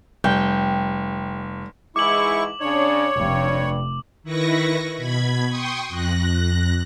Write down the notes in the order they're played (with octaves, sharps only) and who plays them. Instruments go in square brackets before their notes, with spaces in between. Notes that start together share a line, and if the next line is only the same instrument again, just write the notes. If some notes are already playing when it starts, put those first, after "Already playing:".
[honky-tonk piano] F1 [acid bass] G3 [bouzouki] G5
[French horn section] G#2 E3 G#3 [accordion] E4 C#6 [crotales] D6 F#7
[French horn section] C#3 D4 [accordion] C#5
[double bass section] F1 [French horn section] G2
[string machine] D#3 E4 B4 C#6 A#6
B2 B5 G#6
G5 C6 C#6 D#6
F2 F#6 A#6